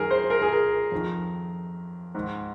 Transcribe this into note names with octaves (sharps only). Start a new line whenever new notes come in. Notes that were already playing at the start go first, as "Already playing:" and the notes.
Already playing: F#2 D#3 G#4 A#4
C5
A#4
G#4
A#4
F2 D#3
G#2 D#3